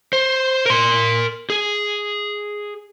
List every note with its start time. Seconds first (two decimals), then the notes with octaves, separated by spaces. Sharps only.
0.13 C5
0.66 A#4 C6
1.50 G#4